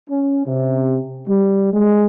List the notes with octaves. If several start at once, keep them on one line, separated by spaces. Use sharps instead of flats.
C#4
C3
G3
G#3